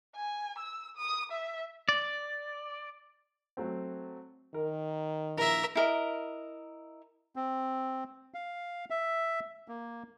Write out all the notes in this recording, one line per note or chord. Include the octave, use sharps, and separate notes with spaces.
G#5
E6
D#6
E5
D5
F#3 A3 C4
D#3 A#4
A#1 E4 A#4 E5
E4 A#4 D#5
C4
F5
E5
A#3